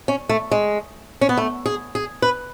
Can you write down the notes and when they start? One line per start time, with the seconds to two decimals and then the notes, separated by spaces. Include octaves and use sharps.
0.08 C#4
0.29 A3
0.51 G#3
1.21 C#4
1.29 B3
1.37 A3
1.66 G#4
1.95 G#4
2.22 B4